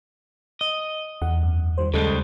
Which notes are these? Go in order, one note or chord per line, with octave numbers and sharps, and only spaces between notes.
D#5
E2 F#5
F#2
D#3 G3 C5
D#2 C#3 G3 G#3 A4 D#5 F#6